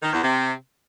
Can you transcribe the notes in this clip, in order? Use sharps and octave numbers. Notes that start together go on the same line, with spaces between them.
D#3
E2
C3